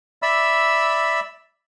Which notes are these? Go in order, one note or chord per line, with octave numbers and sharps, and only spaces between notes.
D5 E5 B5 E6